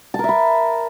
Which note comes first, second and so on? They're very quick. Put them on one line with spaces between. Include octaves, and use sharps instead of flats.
A5 A#4 E5 B5